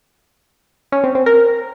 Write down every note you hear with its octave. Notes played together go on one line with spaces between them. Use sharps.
C#4
C4
C4
A#4